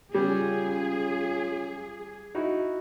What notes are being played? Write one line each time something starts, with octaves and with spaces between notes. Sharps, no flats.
C#3 G3 C#4 F4 G#4
D#4 E4 F#4